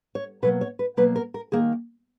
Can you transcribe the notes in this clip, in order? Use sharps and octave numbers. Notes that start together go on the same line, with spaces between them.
C#5
B2 F#3 A#3 B4
C#5
B4
B2 F#3 A#3 B4
A#4
A#4
D#3 A#3 G#4